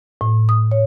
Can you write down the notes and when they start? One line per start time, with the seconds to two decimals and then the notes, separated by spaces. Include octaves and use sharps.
0.21 A2
0.49 D#6
0.72 C#5